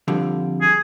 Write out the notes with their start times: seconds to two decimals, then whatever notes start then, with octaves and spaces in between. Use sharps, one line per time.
0.08 F2 D3 G3
0.61 G#4